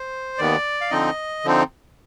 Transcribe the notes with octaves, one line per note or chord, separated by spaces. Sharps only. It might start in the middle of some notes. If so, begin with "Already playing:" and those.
Already playing: C5
D#2 D#3 B3 D5
F5
D3 F3 C4 D#4 D#5
D3 F3 C4 D#4